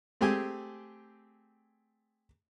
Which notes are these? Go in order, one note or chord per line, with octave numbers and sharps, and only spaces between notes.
A3 C4 G4 G#4 G#5